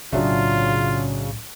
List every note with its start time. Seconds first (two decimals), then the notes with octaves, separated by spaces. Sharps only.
0.13 B1 A2 C#3 F#3 D4 F4 E5